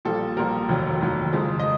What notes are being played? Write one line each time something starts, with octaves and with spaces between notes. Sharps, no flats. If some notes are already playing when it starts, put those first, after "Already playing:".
A#1 A#2 G3 A4
A#1 A#2 G3 A#4
F1 D#2 D#3 F#3
F1 D#2 D#3 F#3
F2 C#3 F3 G#3
D#5